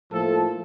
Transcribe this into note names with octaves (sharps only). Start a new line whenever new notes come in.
A2 F3 A#3 A4